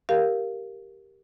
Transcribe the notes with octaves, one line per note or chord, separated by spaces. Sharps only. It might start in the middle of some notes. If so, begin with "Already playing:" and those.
G4 A#4 F5